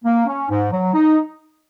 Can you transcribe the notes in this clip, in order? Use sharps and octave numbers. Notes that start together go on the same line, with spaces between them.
A#3
C#4
G#2
F#3
D#4